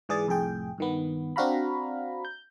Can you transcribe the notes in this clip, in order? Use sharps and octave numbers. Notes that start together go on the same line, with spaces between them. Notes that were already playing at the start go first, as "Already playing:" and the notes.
G#2 E3 G#4 D5 A6
C2 F2 A2 G#4 G5
G2 D#3 B3
C4 D4 F#4 F5 A#5 B5
G6